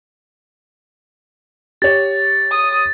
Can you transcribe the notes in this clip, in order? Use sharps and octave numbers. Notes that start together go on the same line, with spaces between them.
G4 C#5 A6
D#6